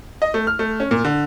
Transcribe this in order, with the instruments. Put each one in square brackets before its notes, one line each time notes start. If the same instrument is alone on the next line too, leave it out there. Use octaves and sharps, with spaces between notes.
[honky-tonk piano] D#5
A3
F6
A3
C#4
A#2
D3